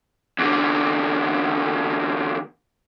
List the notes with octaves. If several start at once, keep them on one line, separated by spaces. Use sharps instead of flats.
E2 D3